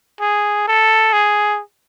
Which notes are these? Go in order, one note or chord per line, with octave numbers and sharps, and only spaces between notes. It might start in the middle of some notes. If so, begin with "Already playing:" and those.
G#4
A4
G#4